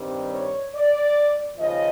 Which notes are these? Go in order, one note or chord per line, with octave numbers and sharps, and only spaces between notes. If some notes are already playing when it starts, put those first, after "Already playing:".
Already playing: G2 D#3 G3 C4
C#5
D5
D#2 C#3 F3 D#5